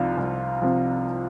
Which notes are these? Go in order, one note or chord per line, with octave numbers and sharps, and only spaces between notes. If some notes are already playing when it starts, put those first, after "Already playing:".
Already playing: C2 C3 F3 D#4 F4
C2
C3 F3